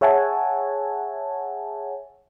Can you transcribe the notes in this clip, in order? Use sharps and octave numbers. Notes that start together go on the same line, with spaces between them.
G#4 C#5 E5 F#5 G#5 A5